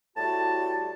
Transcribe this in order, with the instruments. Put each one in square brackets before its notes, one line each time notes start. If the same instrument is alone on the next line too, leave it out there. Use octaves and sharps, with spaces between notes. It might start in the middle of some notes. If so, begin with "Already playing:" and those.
[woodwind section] A2 G3 F#4 A5